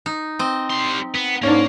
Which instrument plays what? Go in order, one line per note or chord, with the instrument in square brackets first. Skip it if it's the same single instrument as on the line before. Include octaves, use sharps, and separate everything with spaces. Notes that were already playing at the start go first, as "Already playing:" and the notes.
[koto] D#4
C4 D#5
[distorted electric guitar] G3 C6
B3
[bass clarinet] G#2 [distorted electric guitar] A#3 [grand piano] C#4 D4